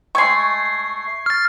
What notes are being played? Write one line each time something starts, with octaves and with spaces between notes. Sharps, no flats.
G#3 A3 C#6 G#6 C7
F6 A6